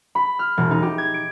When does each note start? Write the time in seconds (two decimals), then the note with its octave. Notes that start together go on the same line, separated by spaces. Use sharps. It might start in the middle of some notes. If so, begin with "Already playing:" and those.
0.15 B5
0.39 F6
0.57 E1
0.71 D#4
0.83 G4
0.98 G#6
1.14 D7